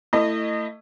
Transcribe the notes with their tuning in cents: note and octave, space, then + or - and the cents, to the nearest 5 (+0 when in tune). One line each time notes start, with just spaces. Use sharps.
A3 +25 E4 +10 D#5 -25